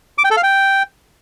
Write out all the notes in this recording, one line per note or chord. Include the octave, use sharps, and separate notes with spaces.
D6
G5
A4
F5
G5